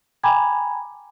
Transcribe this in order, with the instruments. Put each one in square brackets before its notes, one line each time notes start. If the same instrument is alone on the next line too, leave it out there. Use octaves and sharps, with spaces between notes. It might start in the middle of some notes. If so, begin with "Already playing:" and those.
[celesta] G5 G#5 A#5 B5 D6 G#6